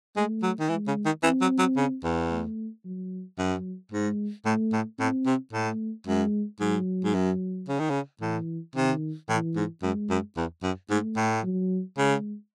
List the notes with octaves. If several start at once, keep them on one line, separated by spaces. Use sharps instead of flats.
G#3 A3
F#3
D#3
E3 G#3
C#3
D#3
E3 C4
F#3
F#3
C#3
E2
A3
F#3
F#2 F#3
G#2 G#3
A2 A3
A2
A2 C4
C3
A2 A3
F#2 G#3
G#2 F#3
G#2
F#2
C#3
D#3
C#3
A2 E3
C3 D#3
A2 E3
G#2
F#2 G#3
F#2
E2
F#2
G#2 A3
A2
F#3
C#3 G#3